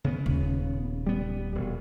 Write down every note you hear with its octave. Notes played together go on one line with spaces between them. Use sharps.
C#3 B3
D#1
G3 B3
E1 G3